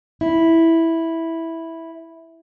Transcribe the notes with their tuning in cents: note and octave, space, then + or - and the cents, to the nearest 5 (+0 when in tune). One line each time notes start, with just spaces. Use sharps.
E4 -5